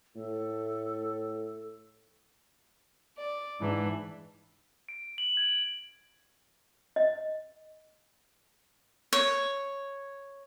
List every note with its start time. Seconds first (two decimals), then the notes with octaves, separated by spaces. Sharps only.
0.16 A2 A4
3.17 D5
3.60 G#2 E3 D4
4.89 D7
5.18 F#7
5.37 G#6
6.96 D#5
9.13 C#5